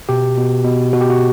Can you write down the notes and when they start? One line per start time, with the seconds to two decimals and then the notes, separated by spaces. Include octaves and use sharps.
0.09 B2 G4
0.37 B2
0.64 B2
0.93 B2 F#4
1.01 G4
1.10 F#4